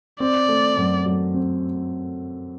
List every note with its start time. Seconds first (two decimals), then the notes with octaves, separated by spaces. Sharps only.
0.20 C4 D5
0.48 A3
0.77 F#2
1.06 F#3
1.34 C4